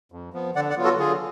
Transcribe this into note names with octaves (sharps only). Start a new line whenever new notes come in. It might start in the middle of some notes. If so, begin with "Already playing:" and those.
F2
F3 B3
D3 D5 F#5
D5 F#5
F#3 B3 F4
F#4 A4
D3 F4 G#4